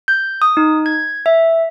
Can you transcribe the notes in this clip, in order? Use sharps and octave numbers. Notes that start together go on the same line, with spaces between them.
G6
D#6
D#4
G#6
E5